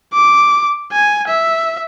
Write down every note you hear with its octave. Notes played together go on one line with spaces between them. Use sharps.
D6
G#5
E5